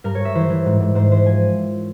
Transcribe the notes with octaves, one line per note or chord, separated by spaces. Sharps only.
G2 A#4
C#5
G2
E5
E3 C5
E3
G#2
G#2
G#2 C5
E3 C5
F3 G#5